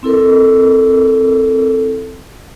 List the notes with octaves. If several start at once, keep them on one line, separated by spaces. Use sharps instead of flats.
C4 E4 A4 A#4